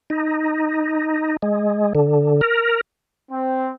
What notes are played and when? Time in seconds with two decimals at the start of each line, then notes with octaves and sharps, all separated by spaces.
0.10 D#4
1.42 G#3
1.95 D3
2.41 A#4
3.32 C4